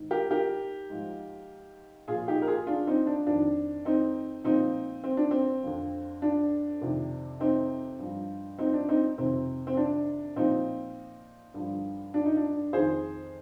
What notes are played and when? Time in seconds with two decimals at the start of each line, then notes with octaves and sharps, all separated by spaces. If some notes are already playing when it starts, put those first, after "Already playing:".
Already playing: G#2 D#3
0.11 G4 A#4
0.31 G4 A#4
0.90 G#2 F3
2.08 A#2 F3 F4 G#4
2.28 D#4 G4
2.42 A#4
2.48 F4 G#4
2.67 D4 F4
2.87 C4 D#4
3.07 D4
3.26 F2 D#3 D4
3.85 C4 D#4
4.44 A#2 F3 C4 D#4
5.04 C4
5.17 D4
5.31 C4
5.63 F2 D3 F3
6.22 D4
6.81 F2 C3 D#3
7.40 C4 D#4
7.99 G2 F3
8.59 C4 D#4
8.73 D4
8.88 C4 D#4
9.18 F2 C3 D#3 C4
9.67 C4
9.77 D4
10.36 A#2 F3 C4 D#4
11.54 G2 D3 F3
12.14 D4
12.25 D#4
12.37 D4
12.73 F2 D#3 G#4 C5